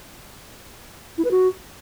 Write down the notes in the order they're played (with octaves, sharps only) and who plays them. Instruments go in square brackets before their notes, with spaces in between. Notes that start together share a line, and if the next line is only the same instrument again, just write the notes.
[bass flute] E4
B4
F#4